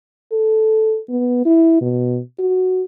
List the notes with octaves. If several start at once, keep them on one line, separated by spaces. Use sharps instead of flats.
A4
B3
E4
B2
F#4